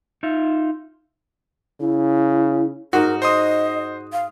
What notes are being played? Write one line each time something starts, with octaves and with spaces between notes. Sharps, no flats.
D#4 F4 E5
C#3 E4
G#2 D#4 F#4 A#4
C5 D#5 C6 D#6
F5